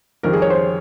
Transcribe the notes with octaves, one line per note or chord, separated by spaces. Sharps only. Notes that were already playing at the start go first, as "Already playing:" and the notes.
F2 D#3 G3 A#4
G#4
C#5
C5